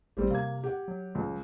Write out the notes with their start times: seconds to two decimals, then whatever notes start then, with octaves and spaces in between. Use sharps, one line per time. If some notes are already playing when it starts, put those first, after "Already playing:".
0.17 A1 G3 C4 G4
0.30 C3 A#3 G#6
0.64 G4 F#5
0.88 F#3
1.15 C#2